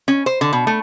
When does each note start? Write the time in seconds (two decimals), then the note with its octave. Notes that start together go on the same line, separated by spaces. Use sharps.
0.08 C#4
0.26 C5
0.41 D3
0.53 B2
0.67 A3